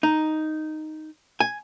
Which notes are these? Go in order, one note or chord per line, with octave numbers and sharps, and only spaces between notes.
D#4
G#5